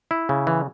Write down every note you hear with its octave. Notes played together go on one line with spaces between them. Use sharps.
E4
C#3
E3